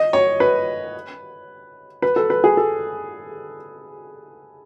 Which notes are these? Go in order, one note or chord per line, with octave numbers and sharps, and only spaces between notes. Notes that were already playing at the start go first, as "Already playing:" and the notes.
Already playing: D#5
C#5
B4
B4
A4
B4
G#4
A4